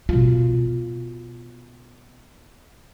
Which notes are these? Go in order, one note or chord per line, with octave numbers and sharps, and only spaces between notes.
B2 F4